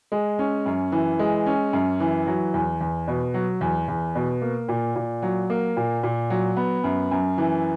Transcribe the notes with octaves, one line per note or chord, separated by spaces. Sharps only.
G#3
C#4
F#2
E3
G#3
C#4
F#2
E3
F#3
E2
E2
B2
F#3
E2
E2
B2
A#3
A#2
A#2
F#3
A#3
A#2
A#2
F#3
B3
F#2
F#2
E3